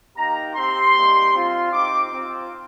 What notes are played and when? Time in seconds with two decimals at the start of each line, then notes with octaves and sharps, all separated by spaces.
0.16 A#3 D#4 G4 A#5
0.55 C4 G4 C6
0.95 G3 A#3 D#4 G4
1.34 C4 F4
1.72 C4 D#4 G4 D6
2.11 C4 F4